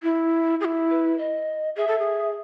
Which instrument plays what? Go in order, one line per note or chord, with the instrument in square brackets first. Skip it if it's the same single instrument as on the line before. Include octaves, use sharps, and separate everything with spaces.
[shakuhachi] E4
G#4
E4
[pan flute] B4
D#5
[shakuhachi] G#4 [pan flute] E5
[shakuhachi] A4
G#4